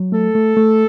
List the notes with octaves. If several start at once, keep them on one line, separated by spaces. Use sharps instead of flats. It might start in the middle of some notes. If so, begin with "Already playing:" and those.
Already playing: F#3
A3 A4
A3
A3